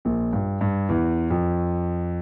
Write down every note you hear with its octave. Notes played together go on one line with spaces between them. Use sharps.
A#1 A#2
G2
G2
E2 E3
F2 F3